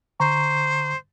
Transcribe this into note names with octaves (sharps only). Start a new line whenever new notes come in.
D3 C5 A#5 C#6